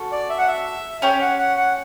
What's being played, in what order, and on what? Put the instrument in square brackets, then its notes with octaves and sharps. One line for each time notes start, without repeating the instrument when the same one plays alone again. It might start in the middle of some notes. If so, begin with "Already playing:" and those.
Already playing: [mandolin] C#4 F#4 A4
[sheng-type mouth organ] D5
E5
F#5
E5
[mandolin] C#4 G4 C#5
[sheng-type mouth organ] F#5
F#5
F#5